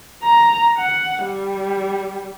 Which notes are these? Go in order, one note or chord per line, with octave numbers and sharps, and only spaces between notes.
A#5
F#5
G3